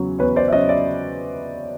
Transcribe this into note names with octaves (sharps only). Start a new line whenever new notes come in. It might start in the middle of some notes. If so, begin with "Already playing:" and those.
Already playing: E2 C#3 F#3
E2 B4 C#5
C5 D5
E5
C#3 F#3 C#5 D#5
D5 E5